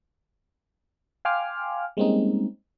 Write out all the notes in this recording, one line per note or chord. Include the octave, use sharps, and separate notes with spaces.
F5 G5 G#5 C6 D6 F6
G3 G#3 A#3 C4 C#4 D#4